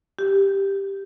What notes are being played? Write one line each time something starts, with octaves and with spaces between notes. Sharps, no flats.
G4